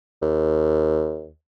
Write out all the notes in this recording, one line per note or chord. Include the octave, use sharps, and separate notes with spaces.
D#2